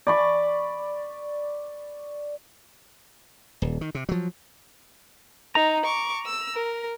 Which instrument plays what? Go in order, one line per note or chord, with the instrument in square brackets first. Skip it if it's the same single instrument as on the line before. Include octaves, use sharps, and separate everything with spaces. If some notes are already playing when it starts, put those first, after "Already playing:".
[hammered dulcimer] D5 B5 C#6
[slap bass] D#1
D#3
C3
F3 F#3
[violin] D#4 [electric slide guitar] A#5
[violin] C#6 D6
E6
A#4